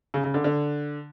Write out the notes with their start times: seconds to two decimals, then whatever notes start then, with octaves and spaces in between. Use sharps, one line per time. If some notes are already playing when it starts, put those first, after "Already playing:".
0.14 C#3
0.24 C#3
0.34 D3
0.44 D3